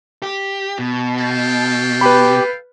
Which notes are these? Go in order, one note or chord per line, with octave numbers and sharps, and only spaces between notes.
G4
B2
A4 F5 G5
G4 B4 B5